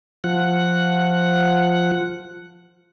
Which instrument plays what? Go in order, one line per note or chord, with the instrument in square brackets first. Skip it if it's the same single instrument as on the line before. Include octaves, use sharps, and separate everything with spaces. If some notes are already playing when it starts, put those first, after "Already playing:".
[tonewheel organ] F3 F#5